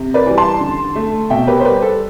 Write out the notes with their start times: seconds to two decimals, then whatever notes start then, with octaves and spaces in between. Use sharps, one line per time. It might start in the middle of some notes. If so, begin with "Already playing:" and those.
Already playing: C3
0.14 B4 D5
0.26 E3 G3
0.38 A5 C6
0.61 D3
0.96 A3
1.30 B2 E5 G5
1.47 G4 B4
1.60 C5
1.65 G3 G4 B4
1.82 A4